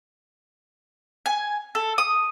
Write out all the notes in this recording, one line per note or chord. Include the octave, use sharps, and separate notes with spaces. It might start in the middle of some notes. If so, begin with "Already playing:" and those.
G#5
A4
D#6